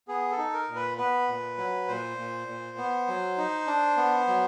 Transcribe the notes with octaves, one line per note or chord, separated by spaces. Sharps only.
B3 G#4
A4
D#4
A#4
A#2
B4
B3 B4
A#2
F#3
A#2 C5
A#2
A#2
B3
F#3
D#4
D4
B3
F#3